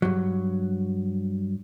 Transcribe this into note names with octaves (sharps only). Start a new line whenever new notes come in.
G2 F#3